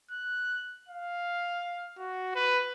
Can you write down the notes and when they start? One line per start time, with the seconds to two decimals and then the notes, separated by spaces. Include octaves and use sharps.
0.11 F#6
0.89 F5
1.97 F#4
2.35 B4